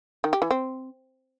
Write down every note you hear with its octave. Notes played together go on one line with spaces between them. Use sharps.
D#3
G4
E3
C4